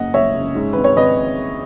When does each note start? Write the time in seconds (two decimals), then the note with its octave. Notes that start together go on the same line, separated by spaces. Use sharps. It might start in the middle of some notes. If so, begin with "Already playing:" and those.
Already playing: F#1 F#2 D#5 F#5
0.13 F#1 C#5 E5
0.35 C#3
0.55 G#2
0.73 G#1 B4
0.84 C#5
0.96 G#1 B4 D#5